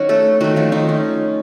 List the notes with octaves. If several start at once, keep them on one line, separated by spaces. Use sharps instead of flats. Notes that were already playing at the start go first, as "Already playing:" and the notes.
Already playing: D#3 F#3 C#4 D#4 F#4 C#5
A3 A4
D#3 F#3 A3 F#4
F3 F4
D#3 D#4
C#4